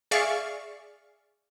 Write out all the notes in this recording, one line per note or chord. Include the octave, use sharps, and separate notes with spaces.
G#4 D5 E5 F5 C#6